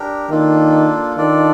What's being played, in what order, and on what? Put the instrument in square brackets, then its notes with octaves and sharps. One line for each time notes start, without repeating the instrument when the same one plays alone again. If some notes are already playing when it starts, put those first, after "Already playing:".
Already playing: [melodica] D4 G4 A#4
[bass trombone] D#3 [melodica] A#3 D4 F4 A4
[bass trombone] D#3 [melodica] D4 F4 A4 D5